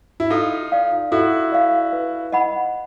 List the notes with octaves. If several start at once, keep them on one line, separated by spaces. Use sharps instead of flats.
E4
D#4 F4 A4
D5 F5
E4 F#4 A4
D5 F5
B4
D#5 F#5 B5